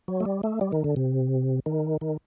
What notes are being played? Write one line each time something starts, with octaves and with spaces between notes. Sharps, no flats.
F#3
A3
G3
A3
G3
D#3
D3
C3
D#3
D#3